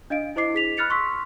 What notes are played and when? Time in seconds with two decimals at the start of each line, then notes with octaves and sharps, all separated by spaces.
0.10 D4 D#5 F5 D7
0.36 E4 C5 D#5 D6 C7
0.55 G#4 B6 F7
0.77 B5 F6 F#6 A6 C#7 F7
0.90 C6 C#6 E6 B6